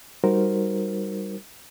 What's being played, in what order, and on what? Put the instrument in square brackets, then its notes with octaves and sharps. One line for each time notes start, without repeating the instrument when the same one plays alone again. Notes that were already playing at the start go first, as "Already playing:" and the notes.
[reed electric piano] G3 D#4 F#4 A#4 C5